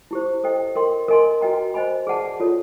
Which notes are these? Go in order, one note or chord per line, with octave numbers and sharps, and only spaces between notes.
E4 G4 C5
A4 C5 D#5 G5
A#4 D#5 G5 C6
A#4 D#5 G#5 C6
F#4 B4 D#5 G5 A#5
C5 D#5 G#5 B5
G#4 B4 D5 F#5 A5
F4 A4 C#5